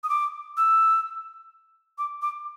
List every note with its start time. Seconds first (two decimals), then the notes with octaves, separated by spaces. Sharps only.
0.04 D#6
0.09 D6
0.57 E6
1.98 D6
2.22 D6